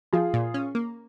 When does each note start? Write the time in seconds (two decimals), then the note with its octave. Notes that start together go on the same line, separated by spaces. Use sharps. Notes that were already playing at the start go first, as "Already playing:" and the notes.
0.13 F3 F4 G#4
0.34 A#2
0.54 C#4
0.75 A#3